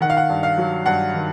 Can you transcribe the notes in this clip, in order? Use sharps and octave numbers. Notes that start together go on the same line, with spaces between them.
D#3 F#5
F5
F#5
G2
F5
F#3
G2 F#5
D#3